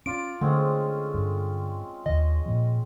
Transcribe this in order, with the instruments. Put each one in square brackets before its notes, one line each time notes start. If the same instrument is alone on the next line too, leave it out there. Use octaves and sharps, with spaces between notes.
[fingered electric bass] C#4 [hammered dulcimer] F4 D5 [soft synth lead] D7
[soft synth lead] D3 [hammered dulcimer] G#3 C4 C#4 [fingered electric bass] A3
[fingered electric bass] G2
[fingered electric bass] D#2 D#3 [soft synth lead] D#5
[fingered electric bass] A#2 F3